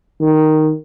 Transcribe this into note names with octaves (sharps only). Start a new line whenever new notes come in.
D#3